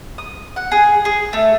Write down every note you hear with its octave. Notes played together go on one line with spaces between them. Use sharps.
D#6
F#5
G#4
G#4
A3